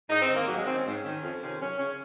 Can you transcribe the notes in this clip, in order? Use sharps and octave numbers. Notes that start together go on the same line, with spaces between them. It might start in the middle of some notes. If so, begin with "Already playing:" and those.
G#2 D#4
C4
D#3
A#3
G#2 F#3
G#3
D#3 C4
C#4
G#2
D#3
F2
C3 D#3
F#2 C#4
C#3 C#4